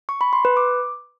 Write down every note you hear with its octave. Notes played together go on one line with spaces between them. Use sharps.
C#6
B5
C6
B4
D6